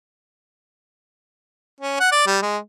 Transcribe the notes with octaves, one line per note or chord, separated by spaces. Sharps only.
C#4
F#5
D5
G3
G#3